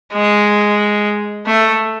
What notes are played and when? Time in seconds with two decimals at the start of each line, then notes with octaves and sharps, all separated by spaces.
0.13 G#3
1.46 A3